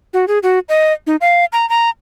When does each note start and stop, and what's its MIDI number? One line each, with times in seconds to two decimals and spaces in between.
0.14 0.25 66
0.28 0.39 68
0.43 0.59 66
0.69 0.93 75
1.07 1.16 63
1.21 1.45 77
1.53 1.68 82
1.69 1.90 82